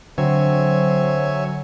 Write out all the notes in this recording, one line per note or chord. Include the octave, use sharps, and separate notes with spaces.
D3 F#3 C4 C#5 E5 G#5